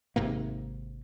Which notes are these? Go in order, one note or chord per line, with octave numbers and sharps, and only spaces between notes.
G#1 G#2 C3 A#3